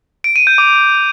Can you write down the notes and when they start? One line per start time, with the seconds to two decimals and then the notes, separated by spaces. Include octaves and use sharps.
0.24 D7
0.36 D#7
0.47 G6
0.58 D6